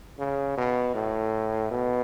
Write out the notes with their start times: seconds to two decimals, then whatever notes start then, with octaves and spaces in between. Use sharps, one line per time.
0.19 C#3
0.57 B2
0.95 A2
1.71 B2